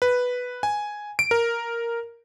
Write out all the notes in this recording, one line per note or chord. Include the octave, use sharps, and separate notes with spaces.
B4
G#5
D7
A#4